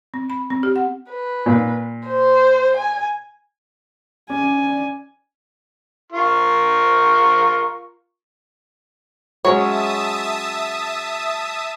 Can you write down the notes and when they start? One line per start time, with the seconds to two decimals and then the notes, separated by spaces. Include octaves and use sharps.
0.14 C4
0.30 B5
0.50 C4
0.63 G4
0.76 F#5
1.09 B4
1.46 A#2
2.07 C5
2.76 G#5
4.30 C#4 D5 G#5
6.12 F4 A#4 C#6
9.45 F#3 G#3 C#4 C#5 E5 A5 D#6